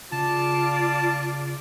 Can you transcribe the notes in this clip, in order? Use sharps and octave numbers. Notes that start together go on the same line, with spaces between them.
C#3 F4 D5 A5